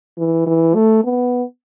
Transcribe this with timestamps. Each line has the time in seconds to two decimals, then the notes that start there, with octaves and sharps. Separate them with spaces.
0.18 E3
0.47 E3
0.75 A3
1.04 B3